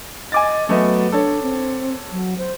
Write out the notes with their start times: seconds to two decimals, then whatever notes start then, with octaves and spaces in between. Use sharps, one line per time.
0.32 D#5 G#5 D6 A6
0.69 F#3 A3 B3 D#5
1.12 D4 A4 C#5
1.42 C4
2.12 F#3
2.38 C5